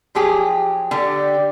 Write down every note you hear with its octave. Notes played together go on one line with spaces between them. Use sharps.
F3 F#3 G4 G#4
D3 G4